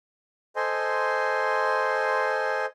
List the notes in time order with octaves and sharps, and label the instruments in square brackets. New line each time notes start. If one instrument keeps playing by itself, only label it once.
[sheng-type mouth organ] A4 C5 D#5 G#5 C6